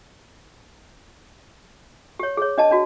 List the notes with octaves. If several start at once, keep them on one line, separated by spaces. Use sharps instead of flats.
G4 C#5
G#4 C#5
D4 D#5 A5
D4 F#4